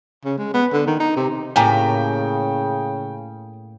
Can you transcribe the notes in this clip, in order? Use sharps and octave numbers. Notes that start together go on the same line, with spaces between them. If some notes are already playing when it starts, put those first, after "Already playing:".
C#3
G#3
B3
D3
D#3
D#4
C3
A2 C#3 A3 A#3 G4 G5 G#5 A#5